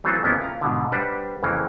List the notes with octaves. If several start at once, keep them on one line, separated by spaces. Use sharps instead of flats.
E3 F#3 A3 C4 F4 A4
F2 C#3 A#3 B3 C#4 E4
F4 A#5
G#2 B2 D3
G3 D4 G4 B4 C5 F#5
F2 C#3 E3 A#3